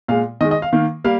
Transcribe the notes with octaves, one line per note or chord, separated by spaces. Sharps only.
A#2 G#3 F5
D#3 G#3 D#5
D#5
F5
D#3 A#3 F5
G3 A#3 F5